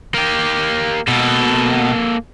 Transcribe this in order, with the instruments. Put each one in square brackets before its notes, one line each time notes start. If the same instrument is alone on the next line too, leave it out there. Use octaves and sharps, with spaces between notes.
[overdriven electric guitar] A#3 G4
[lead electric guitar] B2 [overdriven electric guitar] A#3 A4